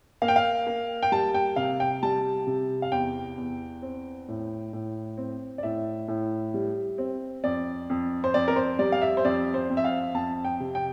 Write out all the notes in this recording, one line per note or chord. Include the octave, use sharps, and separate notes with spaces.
A#3 F5
G5
F5
A#3
G5
G3 A5
G5
C3 F5
G5
G3 A5
C3
F5
E2 G5
E2
C4
A2
A2
C4
D5
A2 E5
A2
G3
C4
F2 D5
F2
C5
F2 D5
A#4
C5
G3 D5
F5
E5
C5
F2 D5
C5
F2
E5
F5
F2 A5
G5
C3
G5